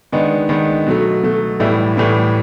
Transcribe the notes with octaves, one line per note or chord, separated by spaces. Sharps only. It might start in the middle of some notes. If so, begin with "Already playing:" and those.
D#3 G#3 B3 D4
D#3 G#3 B3 D4
B2 F#3 A3
B2 F#3 A3
A2 E3 G3 B3 E4
A2 E3 G3 B3 E4